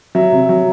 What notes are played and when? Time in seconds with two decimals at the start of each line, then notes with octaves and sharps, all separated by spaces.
0.15 F#3 E5
0.32 C3
0.49 F#3